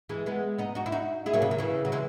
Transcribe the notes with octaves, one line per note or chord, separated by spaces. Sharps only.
E3 G#3
G#3 B3
B3 D#4
D#4 F#4
E4
D#4 F#4
E4 G#4
F#3 A#3
C#3
D#3
C#3 E3
F#3
E3 G#3